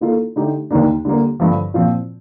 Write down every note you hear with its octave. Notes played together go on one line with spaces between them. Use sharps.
D#3 A#3 F4 A4
D3 A3 D#4 G4
D#2 D#3 A#3 D4
D3 G3 A#3
G2 D3 F3
A#2 F3 C4 F4